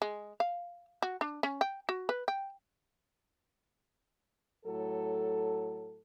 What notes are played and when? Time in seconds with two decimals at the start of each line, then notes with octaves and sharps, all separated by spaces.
0.02 G#3
0.40 F5
1.02 F#4
1.21 D4
1.43 C#4
1.61 G5
1.89 F#4
2.09 B4
2.28 G5
4.65 A2 F#3 A4